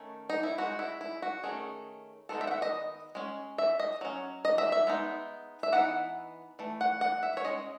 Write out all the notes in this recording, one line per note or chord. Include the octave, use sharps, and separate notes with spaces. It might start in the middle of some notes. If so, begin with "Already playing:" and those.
Already playing: D#3 A3 C#4
D#4
E4
G#3 D#4 F#4
E4
E4
F#4
D#3 A3 C#4 G#4
D#3 G#3 B3 D#4 A4
E5
F#5
E5
D#5
G#3 C#4
E5
D#5
F#3 C#4
D#5
E5
E5
G#3 B3 D#4
E5
E3 B3 D#4 F#5
E3 A3
F#5
F#5
E5
C#5
G#3 C#4 D#5